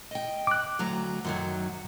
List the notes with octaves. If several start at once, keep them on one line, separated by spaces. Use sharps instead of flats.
D#5 G5
D6 F#6
D2 F#3 A#5
F#2 D#3 F#3